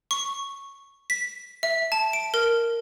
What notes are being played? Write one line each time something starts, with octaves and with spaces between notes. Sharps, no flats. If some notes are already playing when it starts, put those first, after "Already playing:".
C#6
B6
E5
A5
D7
A#4